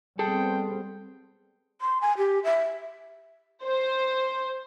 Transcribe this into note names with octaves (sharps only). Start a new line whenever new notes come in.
G3 B3 C4 G#4 A4 G5
C6
G#5
G4
E5
C5